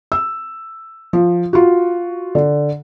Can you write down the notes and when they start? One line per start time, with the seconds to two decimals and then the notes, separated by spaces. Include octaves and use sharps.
0.12 E6
1.13 F3
1.53 F4 F#4
2.35 D3